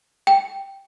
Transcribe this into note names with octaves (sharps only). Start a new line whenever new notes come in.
G5